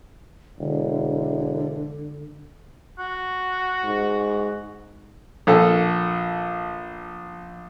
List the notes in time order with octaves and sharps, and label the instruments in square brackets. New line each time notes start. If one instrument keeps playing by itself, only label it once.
[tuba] E1 [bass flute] D3
[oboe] F#4
[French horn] G#2
[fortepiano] A#1 A4